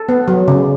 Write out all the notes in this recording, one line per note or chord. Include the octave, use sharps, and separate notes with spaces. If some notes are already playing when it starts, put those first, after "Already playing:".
Already playing: A4
B3
F#3
C#3